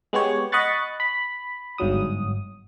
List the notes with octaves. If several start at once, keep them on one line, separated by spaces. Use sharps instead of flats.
G#3 B3 G4 C#5
D#5 F#5 B5 C#6 F#6 A6
B5
G1 G#2 F#3 D#6